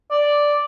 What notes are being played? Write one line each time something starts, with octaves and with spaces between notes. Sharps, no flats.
D5